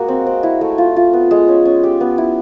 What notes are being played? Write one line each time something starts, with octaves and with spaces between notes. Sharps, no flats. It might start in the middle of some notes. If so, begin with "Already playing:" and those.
Already playing: G#3 A#3 F#4
C4
C4
E4
A3
F4
F4
B3
G#3
C#4
C#4
G4
B3
E4